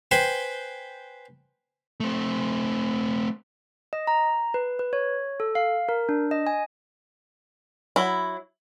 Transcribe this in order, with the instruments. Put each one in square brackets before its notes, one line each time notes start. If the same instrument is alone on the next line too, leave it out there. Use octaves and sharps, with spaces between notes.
[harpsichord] B4 C5 G5 G#5
[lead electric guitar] A3 C4
[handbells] D#5
A#5
B4
B4
C#5
A4
F5
A#4
D4
D#5
G#5
[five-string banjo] F#3 E4